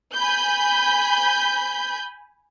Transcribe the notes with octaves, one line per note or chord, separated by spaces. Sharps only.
G#5 B5 G6